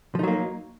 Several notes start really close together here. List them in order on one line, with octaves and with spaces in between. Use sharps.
F3 D#4 F#3 A#3